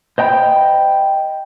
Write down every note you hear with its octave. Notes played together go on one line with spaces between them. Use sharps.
C5 D#5 G5 A#5 B5